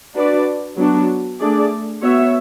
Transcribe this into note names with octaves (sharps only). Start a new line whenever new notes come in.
D4 F#4 B4 D5
F#3 B3 D4 F#4
A3 D4 G#4 D5
B3 F#4 C#5 E5